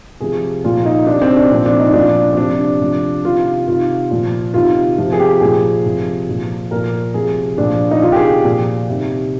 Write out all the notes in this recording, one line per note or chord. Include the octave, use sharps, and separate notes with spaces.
C3 F3 G#4
A#2 F3 F4
D#4
C3 D#3 D4
C4
D4
A#2 F3 C4
D4
D#4
A#2 F3 D4
C4
C3 F3 D4
C3 F3
C3 D#3 F4
C3 D#3 F4
A#2 F3
C3 D#3 F4
C3 F3
G#4
G4
A#2 F3 G#4
C3 F3
A#2 F3
A#2 F3 A#4
C3 F3 G#4
A#2 F3 D4
D#4
C3 D#3 F4
G4
G#4
A#2 F3
C3 D#3